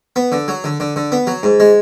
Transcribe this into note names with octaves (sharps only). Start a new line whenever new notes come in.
B3
D3
F#3
D3
D3
D3
B3
F#3
G#2
G#3